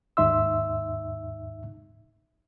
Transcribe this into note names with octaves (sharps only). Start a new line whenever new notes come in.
D#2 G#2 D#4 E5 C6 E6